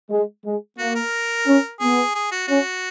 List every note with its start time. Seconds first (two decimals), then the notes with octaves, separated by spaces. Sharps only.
0.10 G#3
0.45 G#3
0.78 A#3 F#4
0.96 A#4
1.46 C#4
1.80 B3 G#4
2.15 G#4
2.32 F#4
2.48 C#4 F#4